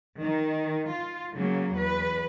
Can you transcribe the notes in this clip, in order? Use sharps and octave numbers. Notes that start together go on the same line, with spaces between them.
D#3
F4
C#3 F#3 A#3
E2 B4